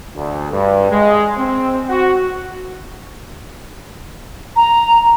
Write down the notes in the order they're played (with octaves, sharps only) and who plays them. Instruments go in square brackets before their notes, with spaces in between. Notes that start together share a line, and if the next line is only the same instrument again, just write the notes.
[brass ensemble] D2
G2
G#3
C4
F#4
[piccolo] A#5